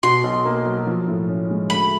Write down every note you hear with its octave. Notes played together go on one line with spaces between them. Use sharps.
B2 C6
B1
A#3
F#3
F3
A2
C#4
G#3
D2 B5